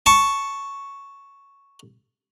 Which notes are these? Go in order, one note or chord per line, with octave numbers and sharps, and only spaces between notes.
A5 C#6